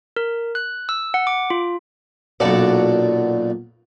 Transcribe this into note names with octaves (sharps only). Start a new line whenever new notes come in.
A#4
F#6
E6
F#5
D6
F4
B1 F#2 A#2 F#4 A4 D5